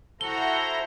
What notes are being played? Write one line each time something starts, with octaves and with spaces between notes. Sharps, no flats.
E4 F#4 A4 C5 F#5 A#5 G7